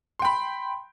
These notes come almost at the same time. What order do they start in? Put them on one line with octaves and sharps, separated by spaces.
C6 G5 B5